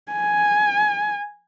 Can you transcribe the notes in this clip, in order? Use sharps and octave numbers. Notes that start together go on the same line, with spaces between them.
G#5